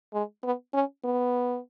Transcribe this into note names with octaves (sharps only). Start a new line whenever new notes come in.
G#3
B3
C#4
B3